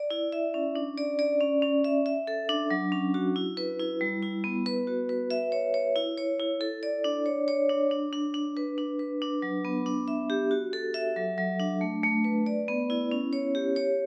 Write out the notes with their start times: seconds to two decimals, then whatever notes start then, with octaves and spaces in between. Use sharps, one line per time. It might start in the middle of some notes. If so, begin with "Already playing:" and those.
Already playing: D5
0.11 E4
0.32 E5
0.54 C#4
0.76 D4
0.98 D5
1.19 D5
1.41 C#4
1.62 C#4
1.84 E5
2.06 E5
2.27 A4
2.49 D4
2.71 F#3
2.92 C#4
3.14 F#4
3.36 E4
3.57 B4
3.79 E4
4.01 G3
4.22 E4
4.44 B3
4.66 B4
4.87 F#4
5.09 B4
5.31 E5
5.52 C#5
5.74 C#5
5.96 E4
6.17 C#5
6.40 E4
6.61 A4
6.83 D5
7.04 D4
7.26 C#5
7.48 C#5
7.69 D4
7.91 D4
8.13 D4
8.34 D4
8.57 B4
8.78 D4
8.99 B4
9.22 D4
9.42 F#3
9.64 B3
9.86 D4
10.08 E5
10.30 G4
10.51 F#4
10.73 A4
10.94 E5
11.16 F#3
11.38 F#3
11.60 D4
11.81 A3
12.04 A3
12.24 B4
12.46 D5
12.68 B3
12.90 E4
13.11 C#4
13.33 C#5
13.55 G4
13.76 C#5